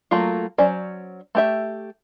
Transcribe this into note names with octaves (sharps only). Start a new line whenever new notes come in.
F#3 A3 A#3 F4
F#3 C#4 C5 D5
A3 G4 E5